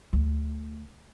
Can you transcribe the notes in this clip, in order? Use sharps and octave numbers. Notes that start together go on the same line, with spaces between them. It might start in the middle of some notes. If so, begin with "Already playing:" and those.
D2